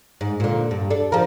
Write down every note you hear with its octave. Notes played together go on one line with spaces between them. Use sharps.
G#2
A#2 D3
G2
D4 A4
F3 A#4